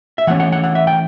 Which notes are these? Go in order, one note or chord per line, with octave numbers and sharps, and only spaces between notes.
E5
E3 A3 C#4 F#5
F#5
F#5
F#5
E5
G5